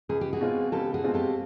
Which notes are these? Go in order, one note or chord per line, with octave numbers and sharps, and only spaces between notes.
C#2 G#4
G4
F#4 G#4
B2 G#3 C4 F4
C#2 G4 A4
F#4 G#4
B2 G#3 C4 F4
G4 A4